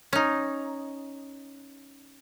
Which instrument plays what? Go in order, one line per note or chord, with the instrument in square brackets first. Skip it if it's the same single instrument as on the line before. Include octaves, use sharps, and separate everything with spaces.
[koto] C#4 D#4